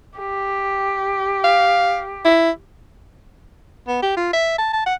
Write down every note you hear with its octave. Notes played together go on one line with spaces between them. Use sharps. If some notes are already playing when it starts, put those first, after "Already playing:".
G4
F5
E4
B3
G4
F4
E5
A5
A5
F#5